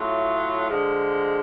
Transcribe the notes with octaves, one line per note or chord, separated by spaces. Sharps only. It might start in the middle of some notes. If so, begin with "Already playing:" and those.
Already playing: A2 F#3 A3 F4
D3 F3 G#3